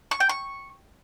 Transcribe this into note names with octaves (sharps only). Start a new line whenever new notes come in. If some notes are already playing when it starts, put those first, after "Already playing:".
C#6
G5
C#6